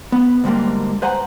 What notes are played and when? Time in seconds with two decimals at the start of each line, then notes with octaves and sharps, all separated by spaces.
0.12 B3
0.44 D2 G#2 G3 A#3
1.02 B4 C5 F#5 G#5 A#5